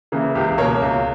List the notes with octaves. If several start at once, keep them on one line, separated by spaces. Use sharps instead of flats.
C#3 E3 A#3
C#2 G4
B2 A#3 C#4 A#4 C#5
C#2